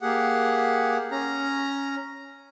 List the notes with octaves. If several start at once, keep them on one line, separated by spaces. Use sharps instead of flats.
A#3 G4 G#4 F#5
C#4 A#5